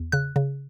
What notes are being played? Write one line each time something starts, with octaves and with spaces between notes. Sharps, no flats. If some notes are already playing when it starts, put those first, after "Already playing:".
Already playing: E2
C#3 F#6
C#3